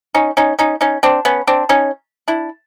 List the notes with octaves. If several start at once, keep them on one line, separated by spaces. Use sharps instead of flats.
C#4 D#4
C#4 D#4
C#4 D#4
C#4 D#4
C4 D4
B3 C#4
C4 D4
C#4 D#4
D4 E4